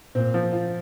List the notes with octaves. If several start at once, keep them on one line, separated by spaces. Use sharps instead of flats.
A#2 C4
F3
F4